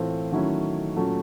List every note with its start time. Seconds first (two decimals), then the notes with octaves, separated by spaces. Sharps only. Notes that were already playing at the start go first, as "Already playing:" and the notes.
Already playing: A2 E3 A3 C4 F4
0.32 D#3 F#3 A3 C#4 E4
0.96 A#2 F#3 A3 C#4